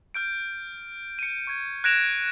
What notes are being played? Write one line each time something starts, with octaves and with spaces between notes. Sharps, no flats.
F6 G6 D7
C#7 D#7
C#6 G#6 D#7
F#6 G#6 A#6 D7 E7 F7